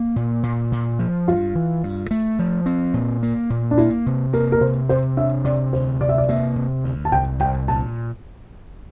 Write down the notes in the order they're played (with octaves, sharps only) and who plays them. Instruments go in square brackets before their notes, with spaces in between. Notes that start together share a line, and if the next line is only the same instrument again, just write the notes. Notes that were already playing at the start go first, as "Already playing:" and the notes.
Already playing: [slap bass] A#3
A#2
A#2
A#2
F3
[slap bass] G2 [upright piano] F4
[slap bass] E3
G2
A3
F3
C4
A#2
A#3
A#2
[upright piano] D4
[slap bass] A#3 [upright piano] E4
[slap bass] C3
[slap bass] A#3 [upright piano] A#4
[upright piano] A#4
[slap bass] C3 [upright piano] C5
[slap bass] C3 [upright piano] C5
[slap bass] D4 [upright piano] E5
[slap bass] C3 [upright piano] D5
[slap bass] D2 [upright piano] C5
[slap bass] C3 [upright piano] D5
[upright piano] E5
D5
[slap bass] A#3 [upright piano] E5
[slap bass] C3
D2
[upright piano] A5
[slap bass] C2 [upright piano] G5
[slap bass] C2 [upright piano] G5
[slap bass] A#2 [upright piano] A5